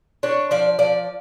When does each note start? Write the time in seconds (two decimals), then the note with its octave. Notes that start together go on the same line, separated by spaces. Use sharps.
0.23 D4 C#5
0.51 F3 D5
0.79 F3 D5